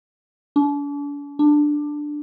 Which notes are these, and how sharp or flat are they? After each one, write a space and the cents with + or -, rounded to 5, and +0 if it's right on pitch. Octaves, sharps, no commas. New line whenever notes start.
D4 -40
D4 +10